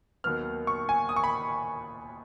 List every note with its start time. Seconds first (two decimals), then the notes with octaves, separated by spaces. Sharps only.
0.24 D#2 D#3 F#3 B3 F6
0.67 C#6
0.89 G#5
1.09 D#6
1.16 C#6
1.24 B5